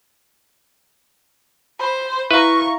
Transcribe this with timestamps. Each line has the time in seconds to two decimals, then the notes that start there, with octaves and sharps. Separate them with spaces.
1.80 C5 B5
2.31 E4 B4 F5 A#5 C#6